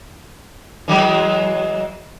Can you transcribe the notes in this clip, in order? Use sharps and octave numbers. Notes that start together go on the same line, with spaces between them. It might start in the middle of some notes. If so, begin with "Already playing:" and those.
E3 F#3 G#3